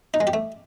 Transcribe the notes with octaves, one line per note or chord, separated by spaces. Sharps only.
D#4
G#3
G4
A3